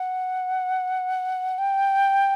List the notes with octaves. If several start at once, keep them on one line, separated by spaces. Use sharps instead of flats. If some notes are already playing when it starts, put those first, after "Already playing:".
Already playing: F#5
G5